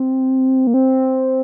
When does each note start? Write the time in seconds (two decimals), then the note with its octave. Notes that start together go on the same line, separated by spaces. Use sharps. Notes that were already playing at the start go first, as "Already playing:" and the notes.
Already playing: C4
0.67 A#3
0.74 C4